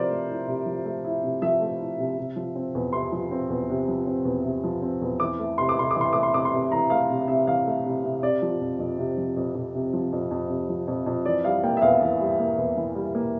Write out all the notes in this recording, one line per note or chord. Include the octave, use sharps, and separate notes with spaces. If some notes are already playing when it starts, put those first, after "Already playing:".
Already playing: C3 F3 E4 A#4 C5 D5
A3
E4
C3
F3
A3
E4
C3
F3 E5
A3
E4
C3
C3
F3
C4
E2
C3 C6
F3
C4
E2
C3
F3
C4
E2
C3
F3
C4
E2
E3 D6
A3
C3 C6
D6
C3 C6
D6
E3
C6
A3 D6
C6
C3 D6
C6
C3
E3 A#5
A3 F5
C3
C3 E5
E3 F5
A3
C3
C3
C3 D5
F3
F2
F2
C3
F3
F2
F2
C3
F3
F2
F2
C3
F3
F2
F2
E3 D5
G3 F5
A#3 G5
E5
E2 F5
E3
G3
A#3
E2
E3
G3
A#3